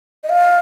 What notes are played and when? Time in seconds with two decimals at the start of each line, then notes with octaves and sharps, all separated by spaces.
0.24 D#5
0.29 F5